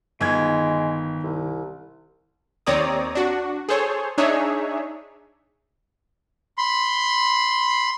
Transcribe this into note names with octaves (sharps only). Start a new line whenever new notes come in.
G1 D#3 G#3 G#6
C2
D#2 C4 C#5 D5 A#5 D#6
D4 F#4
G#4 A4 C5 C#5
D4 D#4 G#4 C#5 E5
B5 C6